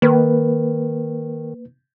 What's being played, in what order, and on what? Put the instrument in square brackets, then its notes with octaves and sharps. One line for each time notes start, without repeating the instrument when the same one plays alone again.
[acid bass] D#3 [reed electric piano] A#3 B4